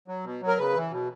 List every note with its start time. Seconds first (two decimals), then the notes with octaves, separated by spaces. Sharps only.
0.08 F#3
0.24 B2
0.41 F#3
0.47 A#4
0.58 C#3 B4
0.75 E3
0.92 B2